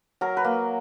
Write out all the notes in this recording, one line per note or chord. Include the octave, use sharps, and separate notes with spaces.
F#3 A#4
B4
A#3